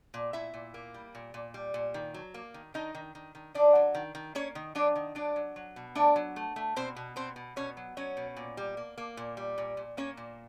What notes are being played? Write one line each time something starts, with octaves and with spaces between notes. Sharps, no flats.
A#2
A#2 E4 E5
A#2
A#3
G3
A#2
A#2
G3
A#2
D#3
F#3
A#3
D#3
D#3 D#4 D#5
D#3
D#3
D#3
D#3 D4 D5
F#3
D#3
D#3
A#3 C#4 C#5
D#3
F#3 D4 D5
D#3
F#3 D4 D5
F#3
F#3
B2
A3 D4 D5
F#3
A3
A3
B2 C4 C5
B2
B2 C4 C5
B2
B2 C#4 C#5
F#3
F#3 C#4 C#5
B2
A#2
G3
A#3
A#3
A#2
G3
A#2
A#2
A#3 C#4 C#5
A#2